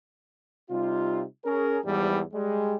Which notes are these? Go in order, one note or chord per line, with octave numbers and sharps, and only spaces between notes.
C3 G3 D#4 F4
C#4 G#4 A#4
E2 G#2 E3 F3 G3
G3 G#3